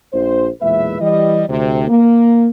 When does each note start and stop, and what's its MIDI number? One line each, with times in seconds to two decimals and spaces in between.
0.13 0.47 34
0.13 0.47 72
0.61 1.00 35
0.61 1.00 40
0.61 1.00 46
0.61 1.00 56
0.61 1.00 71
0.61 1.00 76
1.00 1.43 52
1.00 1.43 55
1.00 1.43 75
1.48 1.85 38
1.48 1.85 48
1.88 2.48 58